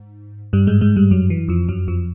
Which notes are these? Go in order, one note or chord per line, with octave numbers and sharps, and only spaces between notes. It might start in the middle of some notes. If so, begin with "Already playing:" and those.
Already playing: G#2
G2 G3
G#2 G#3
G#2 G#3
G2 G3
F#2 F#3
E3
F2 F3
F#2 F#3
F2 F3